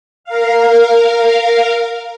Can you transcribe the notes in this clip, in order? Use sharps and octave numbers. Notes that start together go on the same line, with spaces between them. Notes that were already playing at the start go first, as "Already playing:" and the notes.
A#4 F5